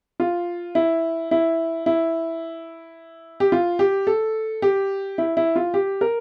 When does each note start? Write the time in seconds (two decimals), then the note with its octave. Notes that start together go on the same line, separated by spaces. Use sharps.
0.20 F4
0.75 E4
1.31 E4
1.86 E4
3.40 G4
3.52 F4
3.79 G4
4.07 A4
4.62 G4
5.18 E4
5.37 E4
5.56 F4
5.74 G4
6.01 A#4